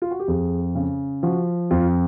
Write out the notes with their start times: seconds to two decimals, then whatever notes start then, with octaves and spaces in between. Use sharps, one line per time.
0.02 F4
0.11 F#4
0.20 G4
0.28 F2 G#4
0.75 C#3
1.23 F3 F#4
1.71 F2 F4